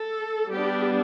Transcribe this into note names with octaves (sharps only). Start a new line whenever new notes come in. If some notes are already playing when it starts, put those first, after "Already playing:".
Already playing: A4
G3 B3 D4 G4